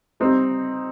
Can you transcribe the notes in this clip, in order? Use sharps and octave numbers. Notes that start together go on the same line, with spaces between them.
G3 C4 D#4